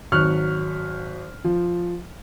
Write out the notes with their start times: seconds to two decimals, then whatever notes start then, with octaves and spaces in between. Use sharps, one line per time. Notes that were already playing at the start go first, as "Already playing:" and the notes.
0.12 G#1 F#3 C#6 F6 F#6
1.44 F3